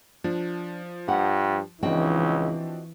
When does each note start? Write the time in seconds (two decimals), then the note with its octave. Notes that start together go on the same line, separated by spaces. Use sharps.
0.24 F3 D4
1.08 G2 G4 F#5
1.83 C#2 E3 F3 C4 D4 F#4 D#5 G5